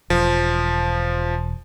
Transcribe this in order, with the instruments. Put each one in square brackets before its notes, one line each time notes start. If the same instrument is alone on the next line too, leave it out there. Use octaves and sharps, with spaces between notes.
[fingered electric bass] E1 [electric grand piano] F3